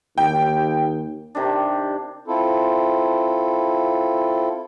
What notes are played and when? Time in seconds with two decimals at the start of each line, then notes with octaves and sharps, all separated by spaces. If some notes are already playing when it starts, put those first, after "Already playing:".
0.18 D#2 G5
1.35 C3 D#3 D4
2.28 C4 E4 F4 A4